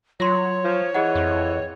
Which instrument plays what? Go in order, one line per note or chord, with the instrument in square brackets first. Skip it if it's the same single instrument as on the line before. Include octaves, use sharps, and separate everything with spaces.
[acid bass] F#3 [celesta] F4 C6 [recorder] C#5
[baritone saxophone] F3
[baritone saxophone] E3 [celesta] G#4 D#5 F#5
[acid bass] F2